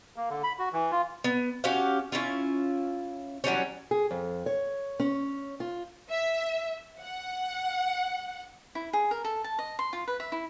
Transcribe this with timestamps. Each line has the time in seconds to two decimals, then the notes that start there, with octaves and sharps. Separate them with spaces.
0.16 A#3
0.30 D3
0.43 B5
0.59 F#4
0.73 E3
0.92 F4
1.24 B3
1.64 C#4 F#4 G4 F5
2.12 C#4 E4 F4
3.44 E3 F#3 G3 C#4
3.91 G#4
4.11 F2
4.46 C#5
5.00 C#4
5.60 F4
6.10 E5
7.00 F#5
8.75 E4
8.93 G#4
9.11 A#4
9.25 A4
9.44 A5
9.59 D#5
9.79 C6
9.93 F4
10.08 B4
10.20 E5
10.32 E4